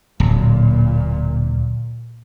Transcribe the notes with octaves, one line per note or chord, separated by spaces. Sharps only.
D1 A#2